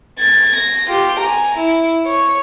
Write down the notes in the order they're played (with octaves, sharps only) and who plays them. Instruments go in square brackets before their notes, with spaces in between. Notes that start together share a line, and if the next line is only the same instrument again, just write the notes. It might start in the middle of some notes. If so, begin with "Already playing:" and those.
[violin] G#6 A6
A#6
F4 G4
G#5 A#5
E4
C#5